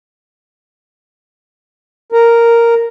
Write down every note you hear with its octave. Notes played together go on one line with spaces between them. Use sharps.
A#4